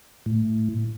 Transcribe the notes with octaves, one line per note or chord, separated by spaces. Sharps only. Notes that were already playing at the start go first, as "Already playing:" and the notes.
A2